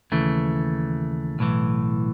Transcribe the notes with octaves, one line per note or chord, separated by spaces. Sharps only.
D#2 C#3 E3 A3
B1 A2 E3